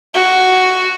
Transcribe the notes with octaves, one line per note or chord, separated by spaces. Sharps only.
F#4